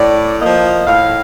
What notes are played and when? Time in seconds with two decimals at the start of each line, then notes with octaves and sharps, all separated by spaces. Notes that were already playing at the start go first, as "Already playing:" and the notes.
Already playing: A2 D5
0.40 F3 A#3 D#5
0.87 A2 F5